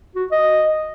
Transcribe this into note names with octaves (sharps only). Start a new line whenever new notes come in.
F#4
D#5